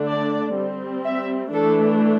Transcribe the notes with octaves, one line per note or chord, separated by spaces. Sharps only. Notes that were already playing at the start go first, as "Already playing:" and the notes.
Already playing: D3 A3 D4
D5
G3 C4
E5
E3 A3 D4 A4